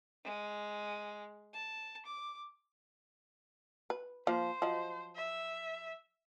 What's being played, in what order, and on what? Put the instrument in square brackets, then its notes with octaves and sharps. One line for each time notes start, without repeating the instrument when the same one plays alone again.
[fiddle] G#3
A5
D6
[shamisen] B4
[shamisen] F3 A#3 [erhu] C5
[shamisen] F3 F#3 D#5
[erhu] E5